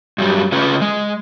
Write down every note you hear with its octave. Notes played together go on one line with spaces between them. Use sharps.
G2 F#3 G3
C#3 C#4 F4 B4
G#3